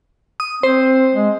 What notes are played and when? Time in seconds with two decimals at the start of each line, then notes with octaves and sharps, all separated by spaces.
0.40 D#6
0.63 C4 C5
1.14 G#3